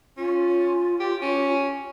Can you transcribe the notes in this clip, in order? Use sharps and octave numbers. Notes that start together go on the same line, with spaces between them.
C#4 F4
G4
C#4